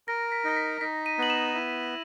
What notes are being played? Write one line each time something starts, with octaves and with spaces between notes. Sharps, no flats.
A#4 A#6
B6
D#4 A#6
B6
D#4 B6
D#7
B3 F#7
E7
E4